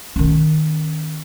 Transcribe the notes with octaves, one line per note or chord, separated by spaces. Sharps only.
D#3 C#4